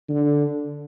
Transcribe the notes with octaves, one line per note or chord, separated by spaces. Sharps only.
D3